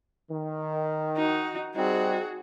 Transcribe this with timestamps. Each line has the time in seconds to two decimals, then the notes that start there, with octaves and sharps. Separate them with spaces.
0.29 D#3
1.17 D#4 F#4
1.76 G3 C4 D#4 F#4 G#4